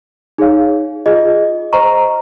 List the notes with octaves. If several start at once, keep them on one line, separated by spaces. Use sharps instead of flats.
D#4 G#4 C#5 F5
F4 G#4 D#5
C5 D#5 A#5 C#6